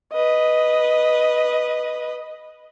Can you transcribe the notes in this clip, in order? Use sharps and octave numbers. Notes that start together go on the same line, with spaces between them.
B4 D#5